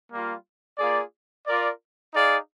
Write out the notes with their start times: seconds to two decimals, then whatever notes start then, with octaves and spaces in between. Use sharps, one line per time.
0.10 G3 A#3 F4
0.78 A#3 F4 G#4 D5
1.47 F4 A#4 D5
2.13 D#4 G#4 D5 F5